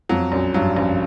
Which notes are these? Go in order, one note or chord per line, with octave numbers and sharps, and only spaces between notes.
F2 F#3
A#1 F#2
G2 F#3
A#1 F#2